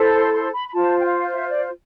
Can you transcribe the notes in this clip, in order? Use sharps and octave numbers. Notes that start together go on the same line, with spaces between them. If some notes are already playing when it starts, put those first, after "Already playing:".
Already playing: E4 A4 C5
C6
C6
B5
B5
F4 C5 A5
G5
F5
E5
D5